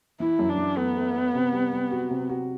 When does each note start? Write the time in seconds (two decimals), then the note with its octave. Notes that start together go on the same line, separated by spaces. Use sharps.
0.20 E3 E4
0.39 F#2
0.49 D4
0.58 E3
0.77 A3 B3
0.97 A3
1.15 A3
1.35 C3
1.53 G3
1.72 G3
1.91 F#4
2.11 C3
2.29 F#4